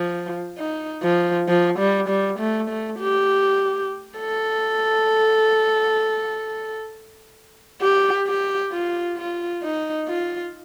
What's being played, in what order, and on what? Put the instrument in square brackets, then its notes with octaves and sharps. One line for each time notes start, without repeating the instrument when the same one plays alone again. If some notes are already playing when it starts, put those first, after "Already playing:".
Already playing: [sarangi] F3
D#4
F3
F3
G3
G3
A3
A3
G4
A4
G4
G4
F4
F4
D#4
F4